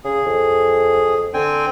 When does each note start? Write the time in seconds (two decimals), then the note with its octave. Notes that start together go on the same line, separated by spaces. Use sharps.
0.04 C#3 G#4
0.26 F2
1.34 D3 C4 G5 G#5